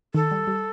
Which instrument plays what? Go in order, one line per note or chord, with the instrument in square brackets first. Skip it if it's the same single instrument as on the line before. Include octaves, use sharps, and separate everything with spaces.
[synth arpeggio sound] D#3 [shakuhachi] A4
[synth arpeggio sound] G3
G3